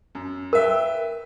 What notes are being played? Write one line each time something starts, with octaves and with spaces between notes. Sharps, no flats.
F#2
A#4 B4 E5 G5